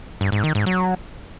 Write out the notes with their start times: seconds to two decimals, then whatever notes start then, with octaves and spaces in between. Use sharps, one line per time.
0.21 G2
0.32 G#2
0.44 D#3
0.55 G#2
0.66 F#3